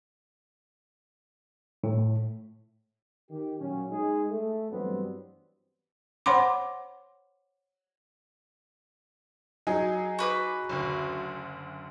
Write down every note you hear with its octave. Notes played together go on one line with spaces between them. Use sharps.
A2
D#3 G4
A#2 F#3 C#4
G#3 D#4 G#4
A3
G2 E3 F#3 G3 B3 C4
C5 C#5 F#5 B5 C6 D6
F#3 D#4 G#4
F#4 B4 D6
F#1 D2